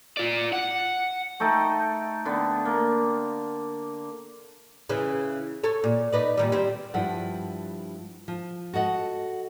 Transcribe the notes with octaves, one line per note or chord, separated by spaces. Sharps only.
F4 D5
F#5
A3 D#4 A4 G5
D3 B3
A#3
C#3 E3
A4 C#5
A#2
D#4 B4 D5
A#2 D#3 G3
G3 C4
G2 F3 E4 F#5
F3
F#4 A4 D#5 F#5